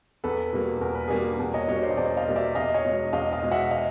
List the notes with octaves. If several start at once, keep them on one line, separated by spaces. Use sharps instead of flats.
E2 A4 B4
B2 G3 A#3
E2 A#4
B4
B2 G3 A#3 G#4 A#4
E2
C#5 D#5
B2 G3 A#3 C#5 D#5
C5 D5
D#5
E2 C5 D5
D#5 F5
B2 G3 A#3
D5 E5
E2 D#5 F5
C#5 D#5
B2 G#3
E2 D#5 F5
D#5 F5
B2 G#3
E5 F#5
D#5 F5